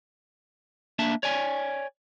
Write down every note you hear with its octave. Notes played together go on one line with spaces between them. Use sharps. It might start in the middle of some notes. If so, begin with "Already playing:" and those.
A#3 D4 E5 A5
C#5 D5 G#5